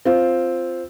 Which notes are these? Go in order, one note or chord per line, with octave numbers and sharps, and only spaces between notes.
C4 F4